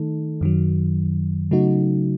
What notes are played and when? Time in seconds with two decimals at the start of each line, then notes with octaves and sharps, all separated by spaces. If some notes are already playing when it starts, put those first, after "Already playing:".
Already playing: D#3 A3 D#4 A4
0.41 F#2 D#3 F#3
1.51 C#3 F#3 A3 D#4 F#4